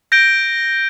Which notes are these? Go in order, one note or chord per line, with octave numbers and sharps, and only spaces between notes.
G6 A#6 D7 G7